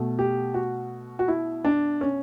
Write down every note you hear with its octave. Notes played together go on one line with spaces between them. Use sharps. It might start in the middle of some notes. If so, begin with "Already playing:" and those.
Already playing: B2 A3
G4
F#4
F#4
E4
D4
C#4